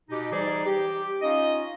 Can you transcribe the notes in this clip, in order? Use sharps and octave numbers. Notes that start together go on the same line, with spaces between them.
B2 D#4 G4
E3 G3 D#4 G#4 C5 D5
G4
C#4 D#4 F4 D#5